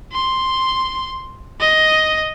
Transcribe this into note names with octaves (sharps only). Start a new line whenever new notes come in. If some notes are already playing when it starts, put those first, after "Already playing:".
C6
D#5